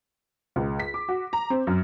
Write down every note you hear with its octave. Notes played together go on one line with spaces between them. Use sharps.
C#2
B6
D6
F#4
A#5
C4
F#2